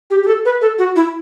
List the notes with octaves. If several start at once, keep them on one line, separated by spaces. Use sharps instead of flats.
G4
G4
A4
B4
A4
F#4
E4